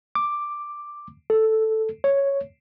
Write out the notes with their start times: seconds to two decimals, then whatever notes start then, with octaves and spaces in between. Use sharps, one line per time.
0.15 D6
1.30 A4
2.04 C#5